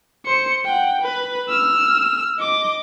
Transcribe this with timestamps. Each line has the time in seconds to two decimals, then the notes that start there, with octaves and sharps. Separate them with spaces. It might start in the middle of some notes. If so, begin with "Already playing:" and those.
0.25 C5 C#7
0.65 F#5 G5
1.02 B4
1.49 E6 F6
2.38 D#5 D6